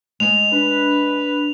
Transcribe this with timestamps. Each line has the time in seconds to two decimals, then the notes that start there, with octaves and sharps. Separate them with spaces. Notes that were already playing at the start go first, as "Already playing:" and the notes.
0.20 G#3 D#5 G#5 F7
0.52 D4 B4